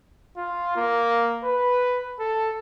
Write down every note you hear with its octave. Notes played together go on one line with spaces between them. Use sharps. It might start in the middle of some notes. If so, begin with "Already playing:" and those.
F4
A#3
B4
A4